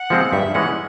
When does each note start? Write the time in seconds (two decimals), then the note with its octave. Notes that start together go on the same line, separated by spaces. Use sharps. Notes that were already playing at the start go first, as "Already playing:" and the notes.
Already playing: F#5
0.10 F3 G#3 C4
0.32 G2 E5
0.54 E3 G#3 C#4 F#5